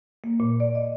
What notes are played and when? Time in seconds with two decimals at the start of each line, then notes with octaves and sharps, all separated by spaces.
0.24 A#3
0.40 A#2
0.60 D5
0.75 D#5